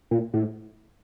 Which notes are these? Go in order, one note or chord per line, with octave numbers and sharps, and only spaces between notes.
A#2
A2